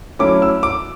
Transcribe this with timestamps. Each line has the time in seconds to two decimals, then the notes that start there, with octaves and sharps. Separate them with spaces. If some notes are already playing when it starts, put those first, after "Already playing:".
0.19 F#3 A3 C#4 E4 D6
0.42 E6
0.63 D6